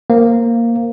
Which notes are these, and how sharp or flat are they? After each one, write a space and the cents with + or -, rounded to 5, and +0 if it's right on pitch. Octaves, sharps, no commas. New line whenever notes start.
A#3 -5 C5 +0